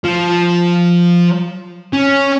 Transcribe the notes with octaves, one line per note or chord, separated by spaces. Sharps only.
F3
C#4